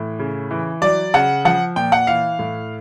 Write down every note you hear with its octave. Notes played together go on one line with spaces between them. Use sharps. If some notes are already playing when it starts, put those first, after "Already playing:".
Already playing: A2 E3
C#3
E3
F#3 D5
C#3 F#5
F3 F#5
A#2 G5
F#5
E3 F5
A2